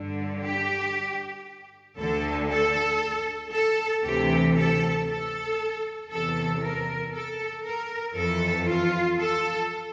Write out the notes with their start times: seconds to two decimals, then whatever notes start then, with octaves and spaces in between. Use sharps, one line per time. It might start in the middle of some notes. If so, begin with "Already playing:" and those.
Already playing: G2 D3
0.43 G4
1.97 D2 D3 A4
2.49 A4
3.52 A4
4.04 D2 C3 E3 G4
4.55 A4
5.07 A4
6.10 E2 C3 E3 A4
6.61 A#4
7.13 A4
7.64 A#4
8.15 F2 E3 A4
8.67 F4
9.20 A4